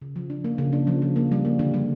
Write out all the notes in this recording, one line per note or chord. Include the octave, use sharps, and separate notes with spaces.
C#3
F3
D4
A#3
C#3
D4
F3
F3
A#3
G3
A#3
D3
G3